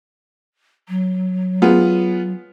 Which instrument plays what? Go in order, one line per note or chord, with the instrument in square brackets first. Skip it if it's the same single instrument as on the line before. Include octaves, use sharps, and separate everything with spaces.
[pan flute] F#3
[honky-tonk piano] B3 F4 G#4